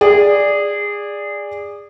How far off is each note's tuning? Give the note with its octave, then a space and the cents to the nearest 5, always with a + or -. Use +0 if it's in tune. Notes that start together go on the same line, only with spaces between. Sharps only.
G#4 -20 D5 +0